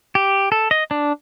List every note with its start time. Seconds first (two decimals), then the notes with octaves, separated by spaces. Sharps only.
0.15 G4
0.52 A4
0.71 D#5
0.91 D4